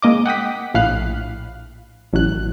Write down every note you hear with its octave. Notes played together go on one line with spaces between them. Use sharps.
G#3 A#3 D#5 D6
F#5 G5 D#6 B6
A#1 A2 F5 B5 F#6 C7
A1 E3 F#3 F#6